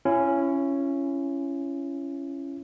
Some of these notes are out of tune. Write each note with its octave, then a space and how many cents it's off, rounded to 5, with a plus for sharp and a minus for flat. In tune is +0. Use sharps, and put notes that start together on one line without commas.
C#4 +0 E4 +40